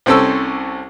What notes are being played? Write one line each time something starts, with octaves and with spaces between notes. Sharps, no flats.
C2 C4 C#4 A4 E6